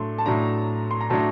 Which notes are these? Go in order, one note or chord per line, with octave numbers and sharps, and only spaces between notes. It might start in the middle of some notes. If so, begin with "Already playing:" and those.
Already playing: A2 F#3 A3 D4 C6
A5
A2 F#3 A3 D4 A#5
C6
A#5
A2 F#3 A3 D4 A5